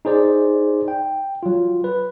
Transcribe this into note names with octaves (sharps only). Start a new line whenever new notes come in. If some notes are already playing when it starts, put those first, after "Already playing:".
D#4 G#4 C5 D5
G5
F#3 F4
B4